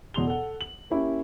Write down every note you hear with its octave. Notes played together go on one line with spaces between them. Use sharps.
E2 B2 G#4 C6 F7 G7
A4 F#5
F#7
A#3 C#4 E4 G4